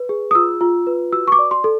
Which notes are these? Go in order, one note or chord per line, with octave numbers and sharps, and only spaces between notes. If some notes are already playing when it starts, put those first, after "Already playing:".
Already playing: B4
G#4
D#6
F4 E6
F4
B4
F#4 E6
C#6
D6
D5
C6
A4